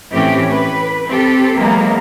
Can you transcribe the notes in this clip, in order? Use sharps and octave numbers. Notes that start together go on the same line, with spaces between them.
A2 E3 A3 C4 C#4 G4
B4
C4 G4 A4
E3 F#3 G#3 A#3 B3